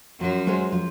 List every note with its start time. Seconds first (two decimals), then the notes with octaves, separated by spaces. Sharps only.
0.20 F#2 F3 F#3
0.47 G#3 C#4 G#4 C5
0.72 F3